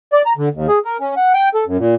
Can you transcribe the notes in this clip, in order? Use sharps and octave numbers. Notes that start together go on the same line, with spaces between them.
D5
A#5
D3
D#2
G#4
A#4
C#4
F#5
G5
A4
F#2
A#2